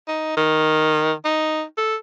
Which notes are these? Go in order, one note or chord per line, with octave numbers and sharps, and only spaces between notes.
D#4
D#3
D#4
A4